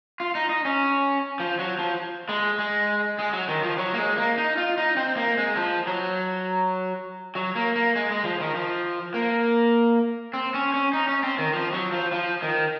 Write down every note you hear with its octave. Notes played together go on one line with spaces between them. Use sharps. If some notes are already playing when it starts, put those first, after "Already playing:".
F4
D#4
D#4
C#4
F3
F#3
F3
G#3
G#3
G#3
F#3
D#3
F3
F#3
A#3
G#3
A#3
D#4
F4
D#4
C4
A#3
G#3
F3
F#3
F#3
A#3
A#3
G#3
G#3
F3
D#3
F3
A#3
C4
C#4
C#4
D#4
C#4
C4
D#3
F3
F#3
F3
F3
D#3